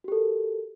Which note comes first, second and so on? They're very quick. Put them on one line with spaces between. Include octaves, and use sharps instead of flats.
F#4 G4 A4 A#4